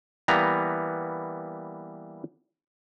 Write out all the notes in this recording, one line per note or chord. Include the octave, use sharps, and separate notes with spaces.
E3 G3 A#3 B3 A#5